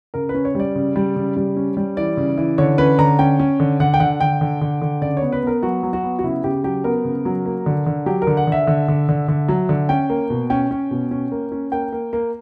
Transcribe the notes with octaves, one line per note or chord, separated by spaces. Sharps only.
C#3 A#4
B4
C#4
C#5
G3 D5
C#3
G3
C#3
G3
C#4
G3
E3 D5
C#3
E3
D3 C#5
C#4 B4
D3 A#5
C#4 G5
C#4
D3
D3 F#5
G5
D3 F#5
D3 G5
D3
D3
D3
C#3 D5
B3 C#5
B4
B3 A#4
F#3 F#4
F#3
F#4
B3
F#4
C#3 E4
C#3 G4
F#3 G4
B3 A#4
C#3
F#3
A#3
D3
D3
F#3 G4
A#4
D3
F#5
D3 E5
D3
D3
D3
D3
F#3
D3
C#4 G5
A#3
B2
C#4 G5
C#4
B2
C#4
A#3
C#4
A#3 G5
A#3
A#3